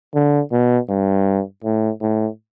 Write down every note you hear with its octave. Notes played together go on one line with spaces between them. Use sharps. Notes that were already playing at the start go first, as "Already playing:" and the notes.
D3
B2
G2
A2
A2